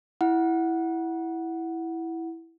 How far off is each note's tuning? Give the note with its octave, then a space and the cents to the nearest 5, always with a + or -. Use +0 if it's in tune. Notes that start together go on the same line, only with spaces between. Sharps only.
E4 +0 F#5 +0